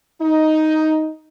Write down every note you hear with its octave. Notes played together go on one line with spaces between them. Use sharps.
D#4